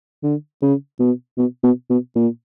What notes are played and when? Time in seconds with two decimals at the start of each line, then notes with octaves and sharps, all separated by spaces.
0.23 D3
0.62 C#3
0.99 B2
1.38 B2
1.63 B2
1.90 B2
2.16 A#2